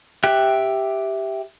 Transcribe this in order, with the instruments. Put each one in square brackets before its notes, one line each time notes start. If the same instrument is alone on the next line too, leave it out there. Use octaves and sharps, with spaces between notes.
[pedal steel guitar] G4 E5 G5 F#6